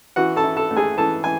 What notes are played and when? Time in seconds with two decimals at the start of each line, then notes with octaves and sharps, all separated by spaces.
0.16 E3 F#4 F#5
0.36 A4 A5
0.44 E4
0.57 A4 A5
0.71 A3
0.77 G#4 G#5
0.97 E3 A4 A5
1.24 E3 G#5